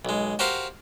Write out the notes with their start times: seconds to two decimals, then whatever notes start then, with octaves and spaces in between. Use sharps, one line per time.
0.05 B1 G#3
0.39 F#4 G4 A#4 C5 F5 F#5